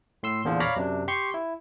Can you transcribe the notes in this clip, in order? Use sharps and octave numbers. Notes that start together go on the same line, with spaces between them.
A2 C6 E6
E2 A#2 D3 F3
C#5 D5 F5 A#5 B5
F#2 C3 D4
G4 C6 C#6
E4